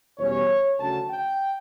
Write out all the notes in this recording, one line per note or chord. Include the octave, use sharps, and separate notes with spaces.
E2 B2 G3 C#4 C#5
D2 C#3 F#3 A5
G5